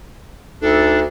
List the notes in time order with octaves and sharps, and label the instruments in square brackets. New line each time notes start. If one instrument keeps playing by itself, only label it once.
[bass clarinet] D2 [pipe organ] D4 [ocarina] D#4 [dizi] A4